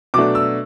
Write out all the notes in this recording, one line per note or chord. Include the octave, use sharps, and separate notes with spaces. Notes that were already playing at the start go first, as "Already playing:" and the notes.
B2 F#3 A3 D4 D6
E6